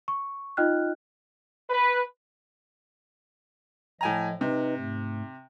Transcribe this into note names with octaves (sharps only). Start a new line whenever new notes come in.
C#6
D#4 F4 D#5 G5 F6 F#6
B4
A2 F3 D#5 G#5 A#5
C3 D#4 B4 D#5
G#2 A3